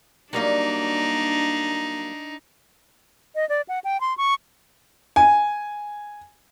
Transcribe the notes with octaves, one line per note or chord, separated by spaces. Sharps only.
F#3 G3 A#3 D4 D#4
D#5
D5
F#5
G5
C6
C#6
G#5